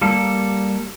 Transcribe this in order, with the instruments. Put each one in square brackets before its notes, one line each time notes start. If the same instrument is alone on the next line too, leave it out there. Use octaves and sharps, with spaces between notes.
[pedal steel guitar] G3 A#3 A4